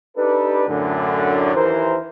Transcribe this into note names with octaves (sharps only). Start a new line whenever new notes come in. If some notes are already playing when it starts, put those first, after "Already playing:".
D4 D#4 G4 A4 B4
F#2 A2 D3
D#2 E3 A#4 C5